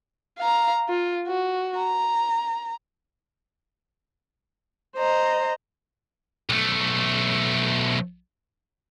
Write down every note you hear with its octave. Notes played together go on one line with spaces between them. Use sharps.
F5 A#5
F4
F#4
A#5
C5 D#5 A#5
B1 A3